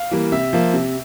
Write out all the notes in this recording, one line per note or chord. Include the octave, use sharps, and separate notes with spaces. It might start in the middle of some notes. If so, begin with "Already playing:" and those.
Already playing: F5
E3 G3 A#3
C3 E5
F3 A#3
C3